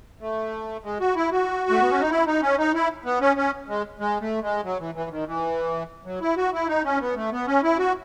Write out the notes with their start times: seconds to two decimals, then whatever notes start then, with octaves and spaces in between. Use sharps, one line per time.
0.20 A3
0.84 G#3
1.00 F#4
1.16 E4
1.31 F#4
1.70 A3
1.80 B3
1.90 C#4
2.00 D#4
2.10 E4
2.27 D#4
2.42 C#4
2.58 D#4
2.74 E4
3.05 B3
3.21 C#4
3.37 C#4
3.68 G#3
3.99 G#3
4.21 A3
4.42 G#3
4.64 F#3
4.79 E3
4.95 E3
5.10 D#3
5.26 E3
6.05 F#3
6.21 E4
6.36 F#4
6.53 E4
6.68 D#4
6.84 C#4
7.00 B3
7.16 A3
7.32 B3
7.47 C#4
7.63 E4
7.79 F#4